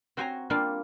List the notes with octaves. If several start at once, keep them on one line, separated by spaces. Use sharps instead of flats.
C4 F#4 C5 C#5 G#5 A#5
G3 A#3 C4 D4 F4